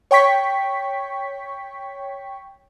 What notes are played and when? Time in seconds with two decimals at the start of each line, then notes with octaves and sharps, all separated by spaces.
0.11 C#5 G5 C#6 B6